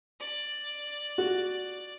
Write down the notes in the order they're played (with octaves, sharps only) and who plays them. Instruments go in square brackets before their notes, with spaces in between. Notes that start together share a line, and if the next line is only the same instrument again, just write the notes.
[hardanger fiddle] D5
[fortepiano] F#4